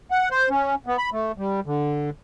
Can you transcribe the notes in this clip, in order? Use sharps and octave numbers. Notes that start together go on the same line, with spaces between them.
F#5
C5
C#4
B3
B5
A3
G3
D3